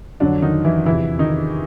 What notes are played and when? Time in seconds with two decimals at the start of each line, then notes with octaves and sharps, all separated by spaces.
0.20 F2 D3 F#3 D4
0.42 D#3 D#4
0.64 E3 E4
0.86 E2 C3 E3 F3 E4
1.19 D#3 D#4